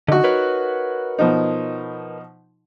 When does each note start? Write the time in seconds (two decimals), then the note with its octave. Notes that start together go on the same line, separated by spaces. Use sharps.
0.08 D3 D#4 F#4
0.24 A#4 B4 C#5
1.19 B2 F3 D#4